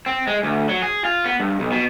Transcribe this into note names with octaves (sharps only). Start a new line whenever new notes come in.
C4
G#3
D2
F#3
G#4
F4
B3
G2
B1
B2